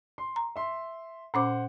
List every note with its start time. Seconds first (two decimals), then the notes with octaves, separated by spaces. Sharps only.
0.18 C6
0.36 A#5
0.56 E5 C6
1.34 A#2 C#4 C5 F#5 D6